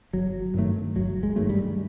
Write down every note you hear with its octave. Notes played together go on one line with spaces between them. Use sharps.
G1 F#3
G2 D#3 F#3 A3
G1 F#3
G#3
G2 D#3 F#3 A3
G3